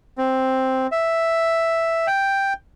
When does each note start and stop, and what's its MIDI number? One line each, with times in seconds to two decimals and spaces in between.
0.18 0.87 60
0.92 2.07 76
2.07 2.53 79